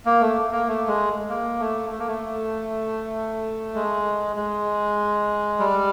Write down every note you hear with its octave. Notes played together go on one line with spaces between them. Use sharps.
A#3
A3
A#3
A3
G#3
A#3
A3
A3
A#3
A3
G#3
G#3
G3